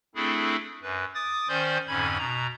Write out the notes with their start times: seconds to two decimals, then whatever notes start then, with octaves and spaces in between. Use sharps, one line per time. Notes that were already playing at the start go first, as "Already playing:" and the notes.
0.15 A3 C4 D4 E4 G#4 A4
0.82 F#2 B4
1.14 D6 D#6 A6
1.49 D#3 C#4 C5 D5 C6 G6
1.88 F2 G#2 D3 C#4 B5 G#6
2.18 B2 A#5